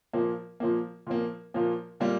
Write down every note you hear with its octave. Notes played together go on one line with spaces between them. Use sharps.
A#2 F3 A#3
A#2 F3 A#3
A#2 F3 A#3
A#2 F3 A#3
A#2 G3 A#3